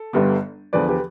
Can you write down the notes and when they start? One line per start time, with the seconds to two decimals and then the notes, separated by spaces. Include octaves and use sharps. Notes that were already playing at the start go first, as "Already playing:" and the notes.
Already playing: A4
0.13 G1 G2 D3 G3 B3
0.73 E2 D3 F3 B4 D5
0.88 G4 B4